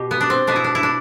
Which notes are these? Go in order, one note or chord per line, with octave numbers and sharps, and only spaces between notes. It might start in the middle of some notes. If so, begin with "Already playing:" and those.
Already playing: B2 G4
B3
D4
C4
B2 B3 D4
E4
D4
E4
D4